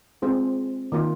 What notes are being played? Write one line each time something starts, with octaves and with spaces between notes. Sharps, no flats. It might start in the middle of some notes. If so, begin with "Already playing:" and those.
G#3 C4 F4 G#4 C5
D#3 A#3 F4